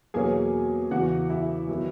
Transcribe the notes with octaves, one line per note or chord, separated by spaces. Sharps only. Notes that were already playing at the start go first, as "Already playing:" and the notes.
E2 B2 F#3 A#3 C#4 G#4 G#5
E2 C#3 E3 F#4 F#5
E4 E5
D#3 F#3 B3